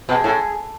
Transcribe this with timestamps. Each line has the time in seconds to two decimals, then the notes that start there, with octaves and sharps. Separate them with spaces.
0.09 B2 G#4
0.24 A2